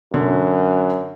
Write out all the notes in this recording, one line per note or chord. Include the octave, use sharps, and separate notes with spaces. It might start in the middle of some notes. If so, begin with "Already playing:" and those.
F#2 D3